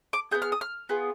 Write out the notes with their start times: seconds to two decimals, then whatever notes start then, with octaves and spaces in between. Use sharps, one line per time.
0.13 D6
0.31 B3 F4 G#4 G6
0.42 F6
0.52 D#6
0.61 F6
0.89 B3 F4 G#4